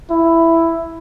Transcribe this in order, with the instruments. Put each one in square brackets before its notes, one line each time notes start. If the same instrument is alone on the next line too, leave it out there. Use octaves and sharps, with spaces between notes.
[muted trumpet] E4